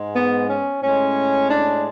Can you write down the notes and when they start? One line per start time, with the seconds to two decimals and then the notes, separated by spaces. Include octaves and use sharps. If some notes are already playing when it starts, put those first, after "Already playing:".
Already playing: G#2 G#3
0.16 B3
0.49 C#4
0.83 A2 G#3 C#4
1.50 D4